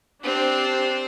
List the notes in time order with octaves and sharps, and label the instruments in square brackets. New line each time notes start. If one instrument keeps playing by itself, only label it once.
[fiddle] C4 C5 [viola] D4 G4